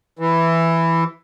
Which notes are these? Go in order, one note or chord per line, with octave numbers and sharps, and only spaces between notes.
E3